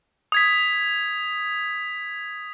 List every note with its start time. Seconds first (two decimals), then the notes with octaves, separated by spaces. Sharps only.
0.32 D#6 G#6 B6